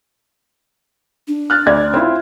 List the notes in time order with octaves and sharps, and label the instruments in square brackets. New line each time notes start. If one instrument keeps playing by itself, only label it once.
[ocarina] D4
[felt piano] F6 F#6 A6
D2 D5 G#6
C4 E4 F4